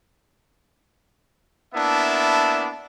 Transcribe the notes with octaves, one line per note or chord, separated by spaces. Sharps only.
A#3 B3 D4 E4 E5 A5